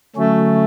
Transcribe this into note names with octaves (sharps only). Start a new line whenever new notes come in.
D3 F#3 A3 C#4 F#4